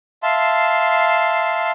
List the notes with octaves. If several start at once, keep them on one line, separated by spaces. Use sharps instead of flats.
E5 F5 A5 C6